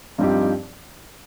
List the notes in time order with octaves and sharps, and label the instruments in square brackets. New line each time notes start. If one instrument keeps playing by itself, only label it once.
[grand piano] G2 F3 C4 D#4 G4